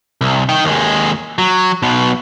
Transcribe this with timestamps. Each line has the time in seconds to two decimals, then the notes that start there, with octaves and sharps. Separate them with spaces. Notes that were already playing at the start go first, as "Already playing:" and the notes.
0.21 C2
0.49 D#4 G5
0.65 D#2 G#3
1.38 F#3
1.82 B1 B2